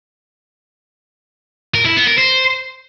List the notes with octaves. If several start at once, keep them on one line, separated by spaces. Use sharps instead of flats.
A#4
E4
B3
A#4
C5